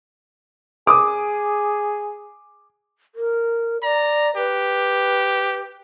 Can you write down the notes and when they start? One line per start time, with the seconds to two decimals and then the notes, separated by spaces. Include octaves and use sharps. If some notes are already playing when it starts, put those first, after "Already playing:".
0.87 G#4 D6 D#6
3.15 A#4
3.83 D5 A#5
4.36 G4 B4